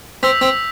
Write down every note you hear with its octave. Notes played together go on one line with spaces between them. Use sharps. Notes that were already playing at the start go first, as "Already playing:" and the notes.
C4 E6 G6 B6 F7
C4